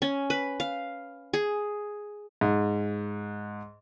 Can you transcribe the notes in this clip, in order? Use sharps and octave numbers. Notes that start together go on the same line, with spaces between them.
C#4
B4
F5
G#4
G#2